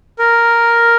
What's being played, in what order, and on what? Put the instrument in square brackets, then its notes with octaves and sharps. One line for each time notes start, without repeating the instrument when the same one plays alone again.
[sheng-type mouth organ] A#4